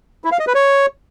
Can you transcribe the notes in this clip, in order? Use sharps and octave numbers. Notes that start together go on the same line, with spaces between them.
E4
F5
D#5
B4
C#5